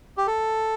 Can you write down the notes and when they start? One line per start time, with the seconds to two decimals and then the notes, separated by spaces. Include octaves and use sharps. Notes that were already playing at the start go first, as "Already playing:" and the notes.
0.17 G4
0.27 A4